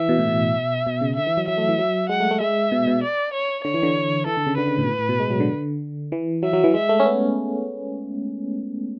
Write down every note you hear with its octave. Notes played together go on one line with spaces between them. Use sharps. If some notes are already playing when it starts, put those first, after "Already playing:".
Already playing: E3 E5
B2
A2
B2
B2
C#3
D3 E5
E3
F#3
F#3 E5
A3
E3
F#3
G#3 F#5
A3
A3
G#3 E5
B2
B2
D5
C#5
D3 C#5
E3
D3
E3 A4
D3
C#3
D3 B4
C#3
A2
B2
A2
A2
B2
G#3
F#3
D3
E3
F#3 E5
F#3
E3
G#3 E5
A3
C#4
B3